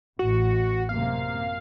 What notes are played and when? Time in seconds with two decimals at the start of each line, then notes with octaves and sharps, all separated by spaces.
0.19 A1 F#4
0.89 F#2 C3 A#3 F5